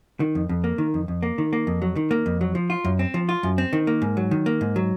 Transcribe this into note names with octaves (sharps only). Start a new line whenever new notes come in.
D#3
F2
F2
A#3
D#3
F2
F2
A#3
D#3
A#3
F2
F#3
D#3
A#3
F2
F#3
F3
F4
F#2
C4
F3
F4
F#2
C4
D#3
A#3
G#2
F#3
D#3
A#3
G#2
F#3